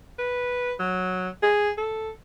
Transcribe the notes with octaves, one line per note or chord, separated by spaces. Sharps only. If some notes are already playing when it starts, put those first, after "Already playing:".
B4
F#3
G#4
A4